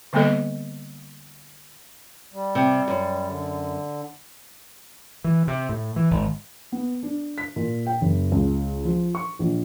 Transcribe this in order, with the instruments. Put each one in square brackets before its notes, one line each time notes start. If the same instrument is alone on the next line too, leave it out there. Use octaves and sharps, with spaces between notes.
[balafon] D3 G3 A#3 B3 A4 D#5
[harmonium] G3
[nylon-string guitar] C3
F#2
[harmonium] D3
[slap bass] E3
C3
A2
E3
G#1
[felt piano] B3
D4
B6
A#2
G5
F#1
C#2
F3
C#6
A#1